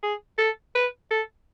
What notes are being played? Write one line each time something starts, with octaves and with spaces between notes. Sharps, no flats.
G#4
A4
B4
A4